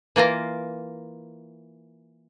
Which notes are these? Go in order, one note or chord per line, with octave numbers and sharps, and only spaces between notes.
E3 A#3 F4 A#4